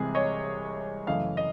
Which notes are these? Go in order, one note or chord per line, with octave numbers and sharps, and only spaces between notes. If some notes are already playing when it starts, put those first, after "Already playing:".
Already playing: C2 C3 E3 G#3 G#4
C#5 D#5
F#2 C#3 E3 A3 D#5 F5
D#5